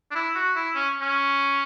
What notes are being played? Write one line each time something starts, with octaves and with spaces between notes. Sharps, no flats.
D4
E4
F#4
E4
C#4
C#4